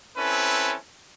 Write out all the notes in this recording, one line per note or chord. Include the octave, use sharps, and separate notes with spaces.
C4 C#4 E4 A4 B4